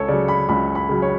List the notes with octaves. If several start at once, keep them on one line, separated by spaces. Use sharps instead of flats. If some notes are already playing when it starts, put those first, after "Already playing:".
Already playing: C#2 A4 C#5
C#3 F#3 D5
B5
C#2 B5
B5
C#3 F#3
C#5